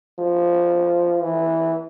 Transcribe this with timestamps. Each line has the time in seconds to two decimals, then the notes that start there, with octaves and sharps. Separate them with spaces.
0.19 F3
1.22 E3